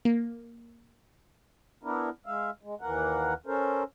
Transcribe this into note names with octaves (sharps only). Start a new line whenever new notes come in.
A#3
B3 D4 E4 A#4
G#3 E5 F5
G#3
D#2 E3 A#3 A#4 F#5
C#4 A4 A#4 C5